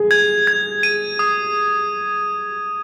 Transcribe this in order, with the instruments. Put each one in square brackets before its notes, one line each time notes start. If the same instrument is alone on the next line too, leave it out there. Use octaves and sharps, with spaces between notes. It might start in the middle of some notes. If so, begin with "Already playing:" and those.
Already playing: [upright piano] G#4
[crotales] G#6
G#6
D#7
D#6